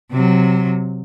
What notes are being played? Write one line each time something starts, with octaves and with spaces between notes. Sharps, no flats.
C3 F#3